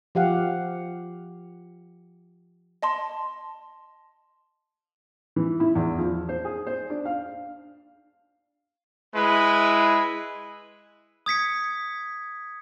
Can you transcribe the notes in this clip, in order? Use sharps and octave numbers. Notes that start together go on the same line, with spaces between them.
F3 G4 F5 F#5
D#5 A5 C6
E3
E4
E2
F3
C5
G#4
C5
D4
F5
G#3 E4 B4
D#6 G#6 B6 C#7